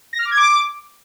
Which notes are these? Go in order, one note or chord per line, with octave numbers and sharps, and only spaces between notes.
A#6
F6
D6
G#6
D6